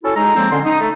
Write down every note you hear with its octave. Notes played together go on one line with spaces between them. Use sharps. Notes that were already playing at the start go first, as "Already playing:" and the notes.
C#4 E4 F#4 A4
G#3 D#4 A#5
D3 F3 G#3 A#3 C4
D3 C#4 C6
D#4
A3